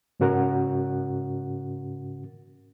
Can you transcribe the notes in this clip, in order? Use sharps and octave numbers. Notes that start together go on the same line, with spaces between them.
G#2 C#3 C#4 F#4 A#4 F#5